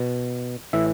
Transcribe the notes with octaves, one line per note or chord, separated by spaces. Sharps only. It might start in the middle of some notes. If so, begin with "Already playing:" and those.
Already playing: B2
A2 E3 E5